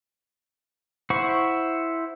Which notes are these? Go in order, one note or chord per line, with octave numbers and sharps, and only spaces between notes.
E4 C5 F#5 C#6